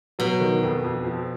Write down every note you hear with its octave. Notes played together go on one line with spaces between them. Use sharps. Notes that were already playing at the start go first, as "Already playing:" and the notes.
B2 F#3
D#3
F2
F2
F3